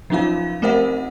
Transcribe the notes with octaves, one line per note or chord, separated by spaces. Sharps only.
F3 F#3 C#4 D#4 F4 F5
A3 C4 A#4 C5 E5 F#5